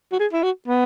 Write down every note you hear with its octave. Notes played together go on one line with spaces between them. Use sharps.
F#4
G#4
E4
F#4
B3